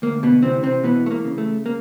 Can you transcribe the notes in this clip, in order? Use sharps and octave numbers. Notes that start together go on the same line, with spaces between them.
D2 A#3
B2 B3
C3 E3 C4
C3 C4
B2 E3 B3
A3
A#3
C#3
A3
A#3